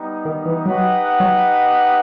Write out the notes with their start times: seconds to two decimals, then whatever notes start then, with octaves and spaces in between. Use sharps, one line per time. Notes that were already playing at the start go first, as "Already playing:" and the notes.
Already playing: G3 B3 D#4
0.25 D#3
0.45 E3
0.66 F#3 D#4 G4 B4 D#5 F#5
1.20 F#3